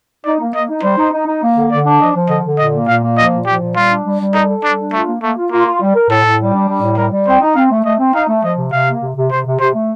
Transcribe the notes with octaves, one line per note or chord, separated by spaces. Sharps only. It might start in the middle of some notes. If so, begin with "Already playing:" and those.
D#4 D5
A#3
A#3 D#5
D#4
G3 C5
D#4
D#4
D#4
A#3
D3
D3 D5
D4
F3 D#5
F3
D3 D#5
D3
A#2 D#5
A#3
A#2 F5
A#3
F3 D#5
A#2
F3 G4
A#2
G3 F4
D4
G3
G3
D#4 A4
A4
G3 D4
D4
A3 F4
A#3
A3 A#3
F4
A#3 F4
F4
G3
A#4
A2 A4
A2
G3
D4
G3
A2
G3 A#4
G3
C4 C5
D#4
C4 F5
A3
A3 D#5
C4
D#4 F5
A3
F3 D#5
C3
C3 F5
A#3
C3
C3
C3 C5
C3
C3 C5
A3